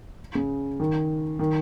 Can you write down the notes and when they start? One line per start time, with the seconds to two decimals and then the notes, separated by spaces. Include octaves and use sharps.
0.35 C#3
0.80 D#3
1.39 D#3